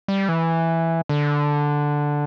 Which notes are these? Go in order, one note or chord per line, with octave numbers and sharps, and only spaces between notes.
G3
E3
D3